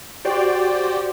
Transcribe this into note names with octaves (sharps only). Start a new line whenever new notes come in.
F#4 G4 C5 D5 G5